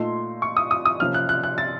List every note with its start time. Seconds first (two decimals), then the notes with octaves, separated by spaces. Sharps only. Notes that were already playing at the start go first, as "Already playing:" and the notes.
Already playing: A#2 A3 D#4 C6
0.42 C#6
0.57 D#6
0.71 D#6
0.85 D#6
1.00 C3 F3 A#3 C#4 F6
1.14 F#6
1.29 F#6
1.43 F#6
1.58 A6